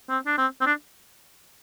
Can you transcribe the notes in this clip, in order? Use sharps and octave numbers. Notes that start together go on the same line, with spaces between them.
C4
D4
C4
C4
D4